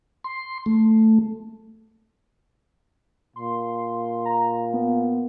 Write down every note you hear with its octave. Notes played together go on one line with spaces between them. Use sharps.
C6
A3
A#2 C6
A#5
B3